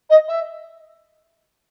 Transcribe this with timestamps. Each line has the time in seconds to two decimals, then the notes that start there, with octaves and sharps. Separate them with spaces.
0.09 D#5
0.28 E5